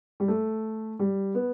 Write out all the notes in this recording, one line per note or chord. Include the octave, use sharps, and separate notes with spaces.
G3
A3
G3
B3